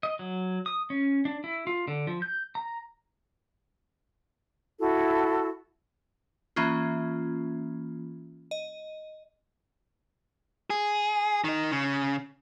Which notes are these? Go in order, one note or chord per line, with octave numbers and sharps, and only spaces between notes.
D#5
F#3
D#6
C#4
D4
E4
F4
D3
F3
G6
A#5
E4 F#4 A4
E3 A#3 C#4 F4
D#5
G#4
D#3 D#4
C#3